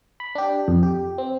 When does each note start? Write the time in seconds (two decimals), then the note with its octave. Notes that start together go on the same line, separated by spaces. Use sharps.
0.20 B5
0.35 D4 G4
0.68 F2
0.83 G4
1.18 C4